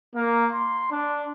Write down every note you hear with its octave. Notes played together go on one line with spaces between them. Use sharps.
A#3
C6
D4